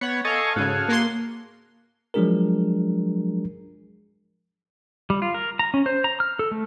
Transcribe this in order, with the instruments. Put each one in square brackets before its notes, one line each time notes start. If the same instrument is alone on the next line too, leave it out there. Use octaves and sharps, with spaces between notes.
[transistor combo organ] B3 [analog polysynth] C#5 F#5
[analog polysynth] A4 F5 [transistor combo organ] D#5 G#5 C#6
[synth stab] G#2 C#3 [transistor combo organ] F#4 G#4
[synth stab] A#3 C6
[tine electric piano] F3 F#3 G#3 D4 G#4 A#4
[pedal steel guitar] G3
F4
A#4
A#5
C#4
C5
A#5
F6
A4
A3